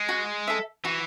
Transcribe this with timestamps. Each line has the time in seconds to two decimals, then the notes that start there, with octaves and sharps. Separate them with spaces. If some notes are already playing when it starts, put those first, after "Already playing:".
Already playing: G#3
0.09 F#4
0.48 A4 E5
0.85 E3 F#4